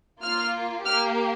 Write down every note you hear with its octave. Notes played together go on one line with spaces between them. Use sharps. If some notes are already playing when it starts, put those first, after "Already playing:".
A#3 F4 F6
A#3 G4 F6